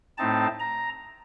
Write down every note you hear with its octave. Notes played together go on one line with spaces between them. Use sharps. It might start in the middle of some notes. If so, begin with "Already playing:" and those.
A2 A3 C4 D#4 A5
A#5